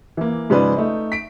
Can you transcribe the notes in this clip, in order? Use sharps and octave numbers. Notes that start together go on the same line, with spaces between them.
E3 A#3
G#2 C#3 F3 G#3 B4 D5
A3 D#4
B6 D7